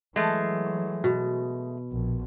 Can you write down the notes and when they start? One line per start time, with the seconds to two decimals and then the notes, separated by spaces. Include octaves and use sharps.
0.16 E3 F#3 G#3 A3
1.04 B2
1.91 A#1